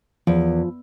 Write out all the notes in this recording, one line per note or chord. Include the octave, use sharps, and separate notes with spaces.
E2 F3